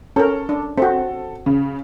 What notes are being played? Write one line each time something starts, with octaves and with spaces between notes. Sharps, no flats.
C#4 A4 A#4
D4
C4 F#4 A4
C#3